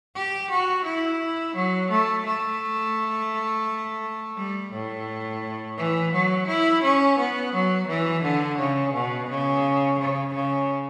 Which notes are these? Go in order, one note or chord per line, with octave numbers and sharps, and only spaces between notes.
G4
F#4
E4
F#3
A3
A3
G3
A2
E3
F#3
E4
C#4
B3
F#3
E3
D3
C#3
B2
C#3
C#3
C#3